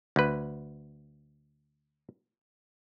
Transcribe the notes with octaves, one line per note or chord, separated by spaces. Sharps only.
D2 B4